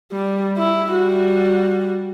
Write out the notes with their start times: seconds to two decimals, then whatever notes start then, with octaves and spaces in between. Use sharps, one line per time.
0.12 G3
0.57 E4
0.91 G3 F#4